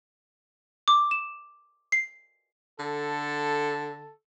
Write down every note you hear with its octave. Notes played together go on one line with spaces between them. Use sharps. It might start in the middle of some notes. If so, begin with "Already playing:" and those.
D6
E7
C7
D3 A4